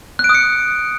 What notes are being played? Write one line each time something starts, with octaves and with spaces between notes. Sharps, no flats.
F#6
D7
D#6
C#7